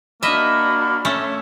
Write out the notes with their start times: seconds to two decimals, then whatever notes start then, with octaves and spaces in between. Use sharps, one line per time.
0.23 A#3 D4 F#4 D#5 E5 B5
1.05 A3 C#4 C#5 E5